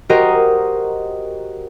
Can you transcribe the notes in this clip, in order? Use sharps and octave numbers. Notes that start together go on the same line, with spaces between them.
F#4 G4 A#4 C5 D#5